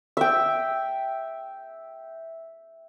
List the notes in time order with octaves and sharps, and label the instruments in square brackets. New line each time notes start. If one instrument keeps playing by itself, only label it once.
[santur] E5 G5